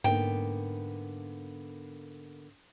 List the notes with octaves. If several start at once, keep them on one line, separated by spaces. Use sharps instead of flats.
G#2 D3 A#3 B3 G5